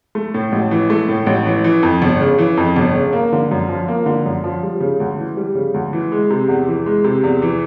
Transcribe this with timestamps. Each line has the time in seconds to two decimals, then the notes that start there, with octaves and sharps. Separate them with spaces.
0.15 A3
0.34 A2
0.52 A1
0.71 E3
0.90 A3
1.09 A2
1.26 A1
1.46 E3
1.64 E3
1.83 F2
2.02 G1
2.21 C#3
2.38 E3
2.57 F2
2.76 G1
2.95 C#3
3.13 A#3
3.33 D3
3.51 F#2
3.69 F3
3.88 A#3
4.06 D3
4.26 F#2
4.44 F3
4.63 G3
4.80 C#3
5.00 D2
5.18 E3
5.37 G3
5.55 C#3
5.74 D2
5.93 E3
6.12 G#3
6.30 C3
6.48 E2
6.68 E3
6.86 G#3
7.04 C3
7.24 E2
7.42 E3